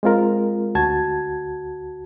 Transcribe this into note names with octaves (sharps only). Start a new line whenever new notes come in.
G#3 C4 F4 A#4
D2 F#4 A5 G#6